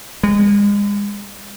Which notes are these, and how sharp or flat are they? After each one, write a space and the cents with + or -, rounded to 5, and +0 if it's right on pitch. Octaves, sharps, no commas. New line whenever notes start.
G#3 -35